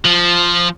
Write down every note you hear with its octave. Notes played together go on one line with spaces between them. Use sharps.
F3